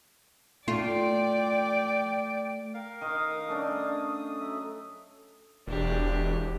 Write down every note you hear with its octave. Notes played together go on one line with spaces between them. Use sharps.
A3 F4 D5 G5
A#4 F5
D#3 D#4 D#5 D#6
A3 C#4 D4
F#3 E5
E1 D4 G4